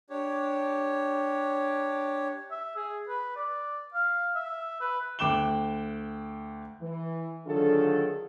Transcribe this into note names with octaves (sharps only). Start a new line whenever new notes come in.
D4 G4 C#5
E5
G#4
B4
D5
F5
E5
B4
D2 G5 D6 F#6 E7 G7
E3
D3 D#3 F#3 F4 G#4 A4